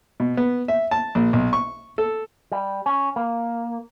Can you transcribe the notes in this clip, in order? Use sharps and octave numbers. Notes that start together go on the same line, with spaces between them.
B2
B3
E5
A5
A#1
B1
C#6
A4
G3
C#4
A#3